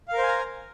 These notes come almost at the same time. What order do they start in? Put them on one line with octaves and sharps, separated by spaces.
F5 A#4 C5 G#5 A#5